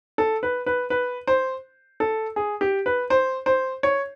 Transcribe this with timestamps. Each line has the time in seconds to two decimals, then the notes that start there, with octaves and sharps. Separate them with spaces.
0.18 A4
0.43 B4
0.66 B4
0.90 B4
1.27 C5
2.00 A4
2.36 G#4
2.61 G4
2.86 B4
3.10 C5
3.46 C5
3.83 C#5